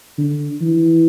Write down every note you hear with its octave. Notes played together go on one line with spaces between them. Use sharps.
D3
E3